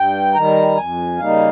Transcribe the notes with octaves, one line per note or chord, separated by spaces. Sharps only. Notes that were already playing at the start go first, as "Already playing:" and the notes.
Already playing: G2 G5
D#3 G3 A#5
F2 G#5
C#3 G3 A#3 D#4 F5